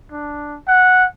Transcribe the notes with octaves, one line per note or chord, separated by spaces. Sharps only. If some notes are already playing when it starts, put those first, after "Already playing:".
D4
F#5